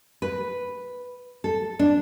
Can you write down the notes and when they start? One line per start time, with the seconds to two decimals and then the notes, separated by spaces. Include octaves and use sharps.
0.22 B4
1.44 A4
1.79 D4